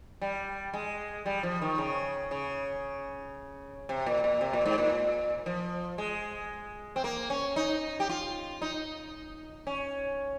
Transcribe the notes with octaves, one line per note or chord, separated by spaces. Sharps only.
G3
G#3
G3
F3
D#3
C#3
C#3
C3
A#2
A#2
C3
A#2
G#2
A#2
F3
G#3
C4
A#3
C#4
D#4
G4
F4
D#4
C#4